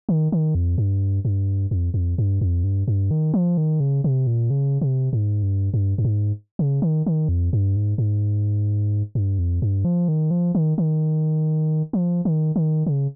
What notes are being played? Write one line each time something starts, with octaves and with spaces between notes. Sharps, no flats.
D#3
D#3
F2
G2
G2
F2
F2
G2
F2
G2
G2
D#3
F3
D#3
C#3
C3
A#2
C#3
C3
G#2
G2
G2
G2
G#2
C#3
D#3
D#3
F2
G2
G#2
G#2
G2
F2
G2
F3
D#3
F3
D#3
D#3
F3
D#3
D#3
C#3